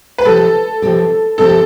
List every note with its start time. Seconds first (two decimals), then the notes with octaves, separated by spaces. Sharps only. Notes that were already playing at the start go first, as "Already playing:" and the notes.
0.18 B4
0.25 C3 F3 C4 G4 A4
0.82 C3 F3 C4 G4
1.38 C3 F3 C4 G4 A4